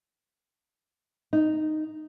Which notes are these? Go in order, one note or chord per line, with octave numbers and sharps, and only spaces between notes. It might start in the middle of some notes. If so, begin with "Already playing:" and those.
D#4